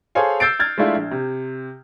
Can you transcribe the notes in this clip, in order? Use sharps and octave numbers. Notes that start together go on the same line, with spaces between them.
G#4 A4 C5 C#5 F5 G#5
E6 G6 A6 C7 D7
F6 G#6 A6
G#3 A3 D4 E4 F4
A#1
C3